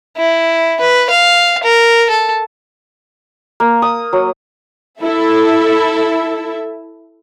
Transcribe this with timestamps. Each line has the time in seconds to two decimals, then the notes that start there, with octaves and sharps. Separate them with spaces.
0.17 E4
0.81 B4
1.10 F5
1.63 A#4
2.10 A4
3.60 A#3
3.82 D#6
4.13 F#3
5.01 E4 A4 E5